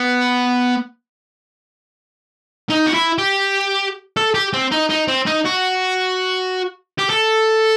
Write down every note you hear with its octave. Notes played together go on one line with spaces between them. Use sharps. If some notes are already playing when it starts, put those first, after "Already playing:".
Already playing: B3
D#4
F#4
E4
G4
A4
G4
C4
D#4
D#4
C4
D#4
F#4
G4
A4